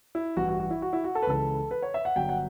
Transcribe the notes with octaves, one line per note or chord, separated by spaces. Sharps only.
E4
A1 G2 E3 G3 F#4
F#4
F#4
E4
F#4
E4
F#4
A4
B4
C#2 C#3 E3 A4
B4
C#5
E5
F#5
G1 G2 F#3 G5
F#5